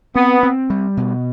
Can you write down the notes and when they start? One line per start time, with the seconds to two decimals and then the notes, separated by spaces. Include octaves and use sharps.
0.15 B3 C4
0.43 C4
0.70 G3
0.97 B2